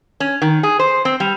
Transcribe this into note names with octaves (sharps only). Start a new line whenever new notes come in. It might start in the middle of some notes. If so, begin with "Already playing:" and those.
C#4
D#3
G#4
C5
C4
G3